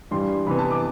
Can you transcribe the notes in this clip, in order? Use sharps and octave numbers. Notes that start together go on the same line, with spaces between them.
G2 E3 G3 C6
C3 E3 B3 B5
A5
D6